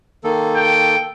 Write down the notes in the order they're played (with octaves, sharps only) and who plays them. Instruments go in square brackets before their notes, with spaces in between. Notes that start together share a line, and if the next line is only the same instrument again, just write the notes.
[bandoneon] D#3 A#3 A4
[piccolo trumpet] G5